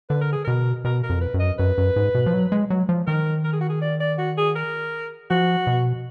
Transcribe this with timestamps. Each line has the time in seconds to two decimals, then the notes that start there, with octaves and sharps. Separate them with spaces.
0.10 D3 B4
0.21 A#4
0.33 G#4
0.45 B2 A#4
0.84 B2 A#4
1.03 A#4
1.09 F2
1.21 B4
1.34 F#2
1.40 D#5
1.59 F#2 B4
1.78 F#2
1.96 G#2
2.15 B2
2.26 F3
2.34 F#3
2.52 G#3
2.70 F#3
2.89 F3
3.07 D#3 A#4
3.45 A#4
3.53 G#4
3.61 F#4
3.69 G#4
3.82 D5
4.00 D5
4.18 F#4
4.38 G#4
4.56 A#4
5.30 F3 F#4
5.67 B2